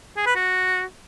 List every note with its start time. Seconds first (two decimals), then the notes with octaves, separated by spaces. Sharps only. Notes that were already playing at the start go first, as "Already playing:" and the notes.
0.17 G#4
0.26 B4
0.36 F#4